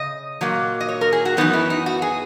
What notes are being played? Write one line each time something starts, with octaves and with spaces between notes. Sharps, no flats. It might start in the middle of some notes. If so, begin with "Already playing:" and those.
Already playing: C#3 D#5
A#2 F#3 A#3
D#5
C#5
A#4
G#4
F#4
F#2 E3 B3 D#4 F#4
E4
D#4
F#4
G#4